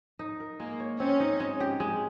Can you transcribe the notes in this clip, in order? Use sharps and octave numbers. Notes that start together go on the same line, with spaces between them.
D#4
A#4
G#3 A#3
C#5
C4 C#4
D#4
G#3
G4
G#3